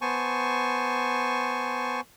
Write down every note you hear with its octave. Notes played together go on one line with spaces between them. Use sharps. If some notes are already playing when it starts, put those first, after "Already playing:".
B3 C5 G#5 A5 C#6